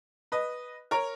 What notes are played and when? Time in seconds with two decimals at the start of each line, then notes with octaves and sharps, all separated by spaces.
0.32 B4 D#5
0.91 A#4 C#5